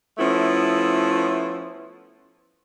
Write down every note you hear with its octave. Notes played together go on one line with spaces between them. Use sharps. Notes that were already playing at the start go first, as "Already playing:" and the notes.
F3 A3 B3 C#4 E4